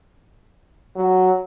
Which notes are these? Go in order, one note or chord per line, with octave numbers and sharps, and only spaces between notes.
F#3